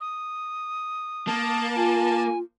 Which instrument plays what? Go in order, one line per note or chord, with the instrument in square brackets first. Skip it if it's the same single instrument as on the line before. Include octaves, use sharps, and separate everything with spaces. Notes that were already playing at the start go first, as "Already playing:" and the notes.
[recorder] D#6
[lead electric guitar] A#3 [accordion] A5
[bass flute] F4 [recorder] G#5